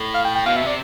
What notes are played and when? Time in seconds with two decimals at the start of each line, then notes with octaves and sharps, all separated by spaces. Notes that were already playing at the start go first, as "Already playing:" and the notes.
Already playing: A2
0.14 F5
0.25 G5
0.35 G5
0.46 B2 F5
0.56 E5
0.62 C3 D5